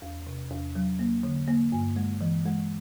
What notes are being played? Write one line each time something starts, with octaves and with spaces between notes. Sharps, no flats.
E2
C3
E2
F#3
A#3
D3
A#3
G2
G#3
E3
G#3